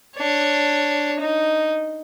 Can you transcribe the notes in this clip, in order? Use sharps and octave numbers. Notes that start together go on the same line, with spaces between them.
D4 C#5
D#4